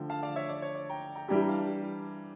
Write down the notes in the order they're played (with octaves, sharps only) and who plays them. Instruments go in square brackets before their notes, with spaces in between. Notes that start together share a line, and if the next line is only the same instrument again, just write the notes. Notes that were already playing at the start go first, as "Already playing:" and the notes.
Already playing: [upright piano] D3 F3 A3 [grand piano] G5
[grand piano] F5 A5
D5 F5
C#5 E5
D5
C#5
D5
G5 A#5
G5 A#5
[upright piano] E3 G3 D4 G4 [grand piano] G5 A#5
[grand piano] A#5
F5 A5